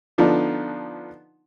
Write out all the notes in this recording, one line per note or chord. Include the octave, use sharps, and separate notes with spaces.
D3 F3 B3 D4 D#4